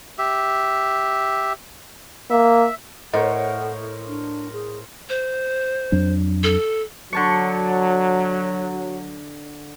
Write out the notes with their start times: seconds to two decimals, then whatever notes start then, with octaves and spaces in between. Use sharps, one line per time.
0.19 G4 E5
2.30 A#3 E5
3.13 A2 A#4 C5 C#5 D#5 F#5
4.07 D4
4.53 G#4
5.09 C5
5.92 F2 F#3 D4
6.43 A4
7.13 D3 F#3 A5 C#6